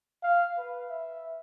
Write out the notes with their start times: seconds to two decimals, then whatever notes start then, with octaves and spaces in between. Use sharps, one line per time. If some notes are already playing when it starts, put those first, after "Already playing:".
0.23 F5
0.58 B4
0.90 E5